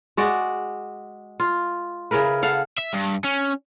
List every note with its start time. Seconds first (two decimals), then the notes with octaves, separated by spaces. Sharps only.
0.17 G#3 F#4 D5
1.40 F4
2.11 C#3 E4 A#4 B4
2.42 A4 F5 F#5
2.78 E5
2.93 G2
3.24 C#4